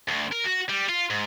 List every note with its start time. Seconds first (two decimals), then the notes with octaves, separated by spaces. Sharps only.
0.08 D2
0.32 A#4
0.45 F#4
0.69 G3
0.89 F4
1.10 G#2